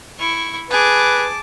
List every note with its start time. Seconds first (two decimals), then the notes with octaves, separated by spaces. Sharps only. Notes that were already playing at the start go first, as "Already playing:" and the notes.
0.19 E4 C#6
0.70 G#4 B4 A5 D6